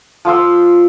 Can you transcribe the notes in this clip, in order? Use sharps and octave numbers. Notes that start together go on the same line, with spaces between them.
F3 F5 C6 E6